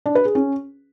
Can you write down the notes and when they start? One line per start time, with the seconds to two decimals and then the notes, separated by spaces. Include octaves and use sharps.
0.06 D4
0.15 B4
0.25 G#4
0.35 C#4